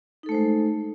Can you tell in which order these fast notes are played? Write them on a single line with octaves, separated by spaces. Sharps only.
D#4 A4 A3 C5 G#3